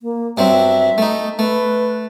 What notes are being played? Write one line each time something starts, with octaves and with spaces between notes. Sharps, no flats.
A#3
G2 F#3 C4 E5
A3 D#4
A3 B4